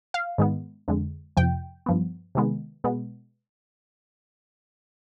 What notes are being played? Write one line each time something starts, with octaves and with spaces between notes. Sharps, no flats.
F5
G#2 D#3 G#3 B3
F2 D3 G#3
F2 C3 F3 G5
G2 F3 B3
C3 D#3 G#3 B3
B2 G#3 B3